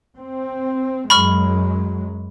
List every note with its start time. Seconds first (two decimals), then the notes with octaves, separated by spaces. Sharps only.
0.17 C4
1.10 F#2 F#3 G#3 B5 C#6 F6